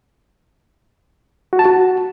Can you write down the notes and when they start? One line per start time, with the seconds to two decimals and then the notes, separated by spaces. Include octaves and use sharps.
1.53 F#4
1.59 A5
1.65 F#4